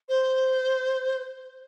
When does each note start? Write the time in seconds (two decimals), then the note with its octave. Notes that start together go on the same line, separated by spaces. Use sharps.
0.09 C5